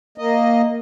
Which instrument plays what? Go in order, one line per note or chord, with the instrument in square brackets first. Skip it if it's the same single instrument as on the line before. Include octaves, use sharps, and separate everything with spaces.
[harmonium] A#3 D#5